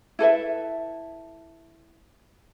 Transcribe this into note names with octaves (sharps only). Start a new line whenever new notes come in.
E4 A4 B4 E5